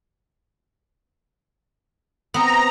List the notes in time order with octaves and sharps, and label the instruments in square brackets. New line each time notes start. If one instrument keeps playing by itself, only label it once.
[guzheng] B3 C4 [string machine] A#5